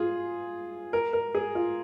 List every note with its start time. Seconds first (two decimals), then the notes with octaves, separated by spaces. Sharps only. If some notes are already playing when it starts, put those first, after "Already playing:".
Already playing: F4 G#4
0.93 A#4
1.13 A#4
1.35 G#4
1.55 F4